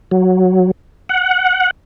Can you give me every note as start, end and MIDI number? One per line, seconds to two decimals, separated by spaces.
0.11 0.71 54
1.09 1.71 78